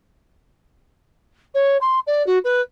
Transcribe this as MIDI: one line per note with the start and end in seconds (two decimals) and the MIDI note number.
1.55 1.77 73
1.81 1.99 84
2.07 2.25 74
2.27 2.38 66
2.44 2.61 71